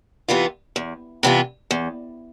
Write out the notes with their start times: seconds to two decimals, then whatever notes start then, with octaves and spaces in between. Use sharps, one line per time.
0.28 C3 E3 B3 F4
0.76 E2
1.23 C3 E3 B3 F4
1.71 E2